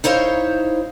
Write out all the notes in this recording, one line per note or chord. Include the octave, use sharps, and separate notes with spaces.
D#4 E4 C5 C#5 F5